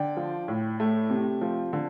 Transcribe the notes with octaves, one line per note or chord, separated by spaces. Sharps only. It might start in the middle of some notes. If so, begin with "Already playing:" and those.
Already playing: D3 D5 G5
F3
A2
A3
C3
F3
D3